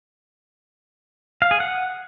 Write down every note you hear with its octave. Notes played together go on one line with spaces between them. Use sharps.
F5
G#4
F#5